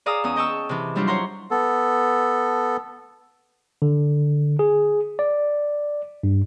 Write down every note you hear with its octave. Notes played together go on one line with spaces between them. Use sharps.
G#4 D5 F5 A#5 D#6 E6
E2 C#4 D#6
D#5 G5 A5 C#6 E6
C3 E3
F#3 G3 D4 E4 F4 G4
C5 C#5 F#5 A#5 C6
B3 A4
D3
G#4
D5
G2